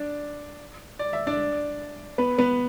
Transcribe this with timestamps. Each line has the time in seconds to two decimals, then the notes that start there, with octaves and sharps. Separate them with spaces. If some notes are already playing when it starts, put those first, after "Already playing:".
Already playing: D4 D5
0.99 D5
1.13 E5
1.27 D4 D5
2.18 B3 B4
2.38 B3 B4